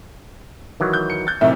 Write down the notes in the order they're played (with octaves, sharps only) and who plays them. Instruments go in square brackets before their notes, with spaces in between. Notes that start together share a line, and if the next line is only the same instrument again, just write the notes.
[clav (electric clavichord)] D#3 E3 F#3
[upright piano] G6
C#7
G6 A6
[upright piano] B1 A2 C3 [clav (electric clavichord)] D#3 [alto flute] E5